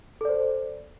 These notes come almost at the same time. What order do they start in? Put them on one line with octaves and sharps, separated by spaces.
A4 D5 C5